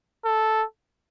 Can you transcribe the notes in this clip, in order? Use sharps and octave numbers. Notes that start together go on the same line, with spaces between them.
A4